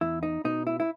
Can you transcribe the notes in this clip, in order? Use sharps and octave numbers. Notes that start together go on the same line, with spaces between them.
E2 E4
D#4
B2 D#4
E4
E4